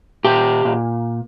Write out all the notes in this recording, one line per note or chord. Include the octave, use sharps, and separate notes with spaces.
A#2 G4
A#2